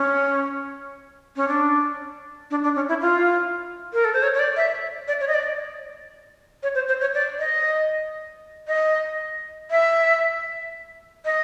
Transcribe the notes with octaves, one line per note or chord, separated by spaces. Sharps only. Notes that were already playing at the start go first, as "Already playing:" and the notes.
Already playing: C#4
C#4
D4
D4
D4
C#4
E4
F4
A#4
A4
C5
C#5
C#5
D5
E5
D5
C#5
D#5
D5
C#5
C5
C5
C#5
D5
D#5
D#5
E5
D#5